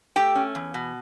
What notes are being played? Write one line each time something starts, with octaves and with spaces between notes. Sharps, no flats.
A3 G4 G5
C#4
E2
B2